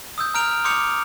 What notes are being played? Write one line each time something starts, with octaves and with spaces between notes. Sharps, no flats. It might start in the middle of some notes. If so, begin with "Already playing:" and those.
D#6 E6 G6
A#5 F6 G6 D7 F7
C6 D6 D#6 G6 C#7 F7